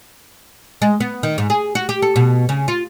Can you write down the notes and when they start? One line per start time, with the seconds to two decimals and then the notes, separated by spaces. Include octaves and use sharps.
0.82 G#3
1.00 B3
1.23 D#3
1.38 G#2
1.50 G#4
1.75 F#4
1.89 G4
2.02 A4
2.16 B2
2.49 C#3
2.68 F4